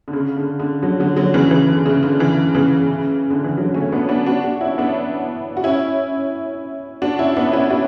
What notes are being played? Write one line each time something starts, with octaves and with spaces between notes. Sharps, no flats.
D3
C#3
D3
D3
D3 F#3
D3 F#3
D3 F#3
C#3 E3
C#3 E3
D3
C#3
D3
C#3 E3
C#3 E3
D3
E3
D3 F#3
A3 C#4
B3 D4
B3 D4
D4 F#4
D4 F#4
C#4 E4
B3 D4
F#4
C#4 E4
D4 F#4
C#4 E4
B3 D4
C#4 E4
D4 F#4